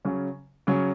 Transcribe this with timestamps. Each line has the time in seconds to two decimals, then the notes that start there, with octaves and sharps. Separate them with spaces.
0.05 C#3 F#3 C#4
0.67 C#3 F#3 C#4